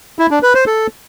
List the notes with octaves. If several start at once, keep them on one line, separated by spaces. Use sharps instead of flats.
E4
D4
B4
C5
A4